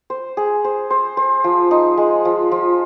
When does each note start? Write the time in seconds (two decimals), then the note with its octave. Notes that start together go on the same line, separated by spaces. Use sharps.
0.10 C5
0.37 G#4
0.64 C5
0.90 C5
1.17 C5
1.44 F3
1.71 D#4
1.97 G#3
2.25 F3
2.51 F3